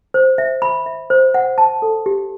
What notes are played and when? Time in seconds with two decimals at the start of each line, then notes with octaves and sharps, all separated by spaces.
0.14 C5
0.38 E5
0.62 B5
0.86 E5
1.10 C5
1.34 F#5
1.58 A5
1.82 A4
2.06 G4